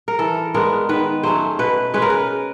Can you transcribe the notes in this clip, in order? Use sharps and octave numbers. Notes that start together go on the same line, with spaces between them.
A#4
E3 A4
G#3 B3 D4 A#4
D#3 B4
F#3 A3 C#4 C5
B2 B4
G#3 C#4 B4
A#4
B4